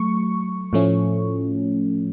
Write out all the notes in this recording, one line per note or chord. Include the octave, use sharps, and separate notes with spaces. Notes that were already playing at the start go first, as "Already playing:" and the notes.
Already playing: F#3 A3 C#6
A2 F3 A3 C#4